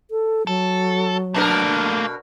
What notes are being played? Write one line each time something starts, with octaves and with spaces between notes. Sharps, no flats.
A4
F#3 A4
B2 A3 A#3 D4 A#4